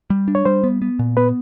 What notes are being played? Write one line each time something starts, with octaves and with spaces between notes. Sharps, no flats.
G3
D4
C#5
G3 C5
B3
B3
A#2
B3 B4